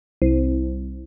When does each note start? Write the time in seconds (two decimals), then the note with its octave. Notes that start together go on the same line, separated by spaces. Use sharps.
0.22 C2